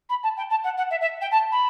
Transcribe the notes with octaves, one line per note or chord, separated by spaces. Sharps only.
B5
A5
G5
A5
F#5
F#5
E5
E5
G5
A5
B5